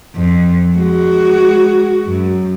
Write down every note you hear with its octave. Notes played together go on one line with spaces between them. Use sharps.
F2
G#3 F#4
F#2